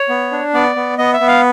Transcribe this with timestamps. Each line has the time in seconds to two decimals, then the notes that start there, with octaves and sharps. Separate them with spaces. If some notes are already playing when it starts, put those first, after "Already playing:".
Already playing: C#5
0.09 B3
0.32 D4
0.54 B3 D5
0.76 B3
0.98 B3 D#5
1.13 E5
1.20 B3
1.28 F5